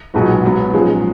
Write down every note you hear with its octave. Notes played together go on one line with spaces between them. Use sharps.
B1 A#2 G#3 B3 F#4
G#2 F#3 B3
A#2 F3 G#3 C#4